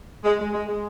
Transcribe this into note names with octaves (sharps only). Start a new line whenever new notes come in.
G#3
G#3
G#3
G#3